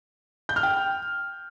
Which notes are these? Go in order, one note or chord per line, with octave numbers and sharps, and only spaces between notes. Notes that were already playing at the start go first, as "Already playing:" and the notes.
G6
F6
G5